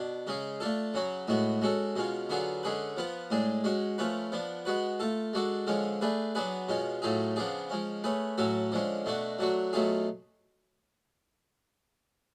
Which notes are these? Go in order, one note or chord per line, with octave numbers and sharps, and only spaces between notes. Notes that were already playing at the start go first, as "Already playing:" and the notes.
Already playing: B2 D4
C#3 G#3 C#4 G#4
A3 D4 F4 A4
C#3 F#3 C#4 F#4
A2 G#3 B3 F#4
G#3 C#4 F#4 A4
B2 G#3 C#4 F4
D3 F#3 B3 F4 G#4
D3 G#3 C#4 G#4 B4
F3 B3 F4 B4
A2 G#3 D4 G#4
G#3 C#4 F#4
F3 A3 C#4 F4 B4
F3 B3 D4
G#3 B3 F#4 B4
A3 F4 A4
G#3 D4 F#4 A4
D3 F3 G#3 C#4 F4
A3 D4 G#4 B4
F#3 B3 D4 G#4 B4
B2 G#3 C#4 F4
A2 F#3 A3 F4 G#4
C#3 F3 B3 D4 G#4
F3 G#3 C#4
A3 C#4 G#4 B4
A2 F#3 C#4 F#4 A4
D3 F3 G#3 C#4
B2 A3 D4 F#4
F#3 A3 D4 F#4
B2 F#3 A3 F4 G#4